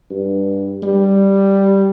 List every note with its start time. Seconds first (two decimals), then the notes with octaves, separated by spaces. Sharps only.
0.11 G2
0.83 G3